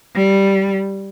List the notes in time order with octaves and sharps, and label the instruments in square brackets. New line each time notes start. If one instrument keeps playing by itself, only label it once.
[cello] G3